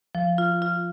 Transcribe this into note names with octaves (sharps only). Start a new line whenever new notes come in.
F3
F4
F4